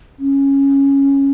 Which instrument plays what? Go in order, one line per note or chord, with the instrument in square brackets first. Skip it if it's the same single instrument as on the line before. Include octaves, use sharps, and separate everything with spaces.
[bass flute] C#4